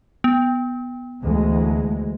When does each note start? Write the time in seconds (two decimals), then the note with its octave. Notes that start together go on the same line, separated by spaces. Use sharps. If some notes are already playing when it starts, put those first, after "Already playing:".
0.24 B3
1.23 D2 E3 G#3